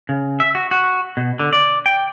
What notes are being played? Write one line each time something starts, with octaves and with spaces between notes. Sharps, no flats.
C#3
E5
F#4
F#4
B2
D3
D5
G5